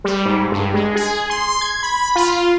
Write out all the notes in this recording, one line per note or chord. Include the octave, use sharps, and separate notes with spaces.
G3
G#2
G2
G#3
G#4
C6
G#6
B5
F4